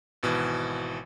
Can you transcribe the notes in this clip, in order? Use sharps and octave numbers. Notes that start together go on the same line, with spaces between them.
G#1 B2 E3